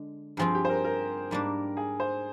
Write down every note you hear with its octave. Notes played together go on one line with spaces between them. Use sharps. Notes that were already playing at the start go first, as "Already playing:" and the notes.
Already playing: D3 G#3
G2 F3 C4 F4 G#4
G4
C5
A#4
A#4
G#2 G3 A#3 D4
G#4
C5